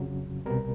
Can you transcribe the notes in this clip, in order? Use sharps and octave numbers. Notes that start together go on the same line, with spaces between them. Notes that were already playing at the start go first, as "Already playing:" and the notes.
Already playing: F2 C#3 F#3
C2 B2 G3 A#4